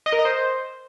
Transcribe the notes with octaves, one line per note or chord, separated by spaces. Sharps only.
D#5
A#4
D#5
C5